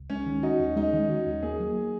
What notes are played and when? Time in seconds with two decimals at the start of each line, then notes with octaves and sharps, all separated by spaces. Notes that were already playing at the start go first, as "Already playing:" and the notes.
Already playing: C#2
0.10 G#3 C#4
0.26 D#3
0.43 D#4 F#4
0.59 D#2
0.76 G#3 D#4
0.93 D#3
1.09 F#4
1.26 D#2
1.43 A#3 G#4
1.60 F#3